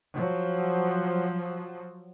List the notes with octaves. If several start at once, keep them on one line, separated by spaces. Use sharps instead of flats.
F3 F#3